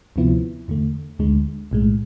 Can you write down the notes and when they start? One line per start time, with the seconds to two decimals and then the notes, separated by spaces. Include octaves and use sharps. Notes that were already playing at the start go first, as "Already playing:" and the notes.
0.16 D2 C3 F3 B3 E4
0.68 E2 D3 A3
1.19 D2 D3 G#3
1.71 B1 A2 G#3